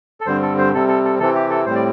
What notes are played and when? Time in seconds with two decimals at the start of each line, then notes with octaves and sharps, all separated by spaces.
0.21 A4
0.26 G2 D3 G3 C4 C5
0.42 A4
0.58 C5
0.74 C3 G3 C4 A4
0.88 A4
1.04 A4
1.19 C3 E3 C4 A4
1.35 G4
1.50 A4
1.65 A2 G3 C4 C5
1.75 D5